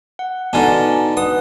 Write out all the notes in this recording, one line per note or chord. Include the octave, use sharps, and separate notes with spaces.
F#5
B2 D3 D#4 G#5 A5
B4 F#5 D#6